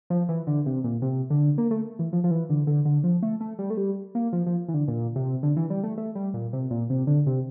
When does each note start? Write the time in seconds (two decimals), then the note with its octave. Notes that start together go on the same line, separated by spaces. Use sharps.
0.10 F3
0.29 E3
0.47 D3
0.66 C3
0.84 A#2
1.02 C3
1.30 D3
1.58 A#3
1.71 A3
1.99 E3
2.13 F3
2.24 F3
2.31 E3
2.50 D3
2.67 D3
2.85 D3
3.04 F3
3.23 A3
3.41 A3
3.59 G3
3.70 A3
3.77 G3
4.15 A#3
4.33 F3
4.46 F3
4.68 E3
4.74 D3
4.88 A#2
5.16 C3
5.43 D3
5.57 E3
5.70 G3
5.83 A3
5.98 A3
6.15 G3
6.34 A#2
6.53 C3
6.70 A#2
6.90 C3
7.07 D3
7.26 C3